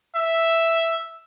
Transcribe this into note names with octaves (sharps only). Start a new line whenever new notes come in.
E5